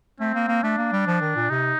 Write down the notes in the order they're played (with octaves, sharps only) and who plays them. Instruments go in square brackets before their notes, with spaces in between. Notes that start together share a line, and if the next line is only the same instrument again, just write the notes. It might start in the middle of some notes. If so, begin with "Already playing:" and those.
[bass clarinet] A3 [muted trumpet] C4
[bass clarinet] A#3
A#3
[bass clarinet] A3 [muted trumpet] D4
[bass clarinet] A#3
G3
F3
D#3
A#2
[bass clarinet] C3 [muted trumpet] D#4